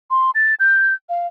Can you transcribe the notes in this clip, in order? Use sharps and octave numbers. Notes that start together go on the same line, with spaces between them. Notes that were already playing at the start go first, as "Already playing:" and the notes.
C6
A6
G6
F5